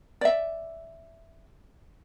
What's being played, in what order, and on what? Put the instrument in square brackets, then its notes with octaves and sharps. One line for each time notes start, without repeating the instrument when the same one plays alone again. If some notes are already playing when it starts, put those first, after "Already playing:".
[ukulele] D5 E5